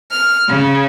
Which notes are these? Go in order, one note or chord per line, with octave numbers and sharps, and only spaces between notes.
F6
C#3